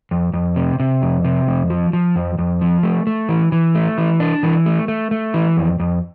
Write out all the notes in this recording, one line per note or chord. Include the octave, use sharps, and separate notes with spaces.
F2
F2
C3
C3
F2
C3
F2
F3
F3
F2
F2
F3
A3
A3
E3
E3
A3
E3
D4
E3
A3
A3
A3
E3
F2
F2